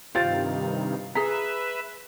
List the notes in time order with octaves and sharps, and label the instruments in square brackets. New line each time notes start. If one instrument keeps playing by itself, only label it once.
[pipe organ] G2 C3 D#3 [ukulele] F4 G4 C5 [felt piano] F5 A6
[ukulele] G#4 A#5 [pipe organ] B4 E5 [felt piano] B6